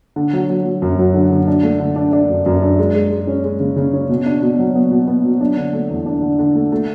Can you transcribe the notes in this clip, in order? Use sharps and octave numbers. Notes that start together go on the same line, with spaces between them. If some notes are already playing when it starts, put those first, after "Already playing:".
D3
F#3
F#3
F#3
F#2
F#3
D3
D3
D4
A3
D3
D4
D4
F#2
F#2
D4
G#3
G#3
G#3
C#4
G#3
C#3
C#3
C#4
B2
D4
B2
F#3
B3
B2
B3
F#3
D4
D3
A3
E2
D4
D3
D3
A3
A3